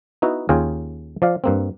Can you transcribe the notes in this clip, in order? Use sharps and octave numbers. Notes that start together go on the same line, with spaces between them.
B3 D#4 E4 F#4
D#2 C#4 F4 G#4 G5
F3 D5 F5
G2 A#3 C4